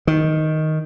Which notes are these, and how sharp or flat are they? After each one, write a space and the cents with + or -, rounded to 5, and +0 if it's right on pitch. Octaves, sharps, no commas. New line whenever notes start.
D#3 +5